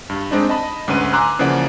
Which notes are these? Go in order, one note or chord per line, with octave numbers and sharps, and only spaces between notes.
G2
G#3 C4 D4 D#4
D#5 A5 B5
D2 G#2 C#4 B4 D#7
G#5 A#5 C6 D6 E6 F#6
C#3 E3 F3 A#3 D5 F#5